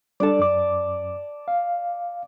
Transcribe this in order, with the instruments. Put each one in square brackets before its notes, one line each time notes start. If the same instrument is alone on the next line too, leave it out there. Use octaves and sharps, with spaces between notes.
[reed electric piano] G3 D4 A4 [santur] D5 A5
[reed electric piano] F#2 D6
F5